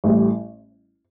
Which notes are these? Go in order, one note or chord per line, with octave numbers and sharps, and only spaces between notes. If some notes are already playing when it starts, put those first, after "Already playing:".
A1 A2 G3